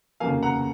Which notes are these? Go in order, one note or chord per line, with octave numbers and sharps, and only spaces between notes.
F1 D#2 C#3 F#3 A#3 F5 G#5
F#5 A#5